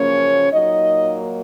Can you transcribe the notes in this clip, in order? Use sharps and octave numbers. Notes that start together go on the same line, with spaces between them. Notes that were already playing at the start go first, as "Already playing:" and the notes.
Already playing: F#2 C#3 F3 A#3 C#4 C#5
A#2 F#3 A#3 D#4 D#5